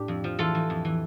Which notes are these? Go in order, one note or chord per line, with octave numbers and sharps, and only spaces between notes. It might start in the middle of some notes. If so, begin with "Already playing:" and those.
Already playing: A2 D4 G4
F2
F3
E3 F4 A4
E3
F2
E3